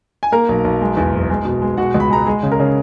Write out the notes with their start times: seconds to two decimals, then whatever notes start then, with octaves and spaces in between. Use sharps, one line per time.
0.23 G#5
0.32 A#3 A#4 A#5
0.49 B1
0.65 B1
0.81 G#3
0.97 E2
1.13 F#1
1.30 G#3
1.45 B2
1.62 G#3
1.77 B2 F#4 F#5
1.94 C#2
2.00 B5
2.10 G#3 A#5
2.27 G#3 G#4 G#5
2.43 C#3
2.52 A#4 A#5
2.60 C#3